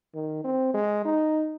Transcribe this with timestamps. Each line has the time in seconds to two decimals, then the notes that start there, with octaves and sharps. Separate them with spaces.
0.14 D#3
0.44 C4
0.74 G#3
1.05 D#4